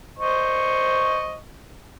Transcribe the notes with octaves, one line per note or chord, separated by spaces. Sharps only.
C5 D#5 C#6